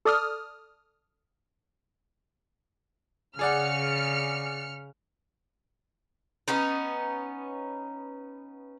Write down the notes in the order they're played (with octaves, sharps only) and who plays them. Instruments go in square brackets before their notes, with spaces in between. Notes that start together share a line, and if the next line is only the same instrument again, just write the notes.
[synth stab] A4 D5 D#6 F6
[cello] C#3 [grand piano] G#4 D5 F#5 [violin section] F6 C#7
[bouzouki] B3 C#4 D#4